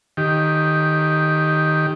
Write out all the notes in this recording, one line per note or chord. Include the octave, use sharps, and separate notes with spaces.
D#3 G4